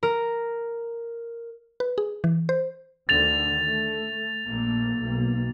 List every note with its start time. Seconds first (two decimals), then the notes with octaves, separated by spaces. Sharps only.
0.03 A#4
1.80 B4
1.98 G#4
2.24 E3
2.49 C5
3.09 D2 D3 D#3 A6 F7
3.67 A3
4.48 A#1 A3 A#3
5.02 B1 B2 A#3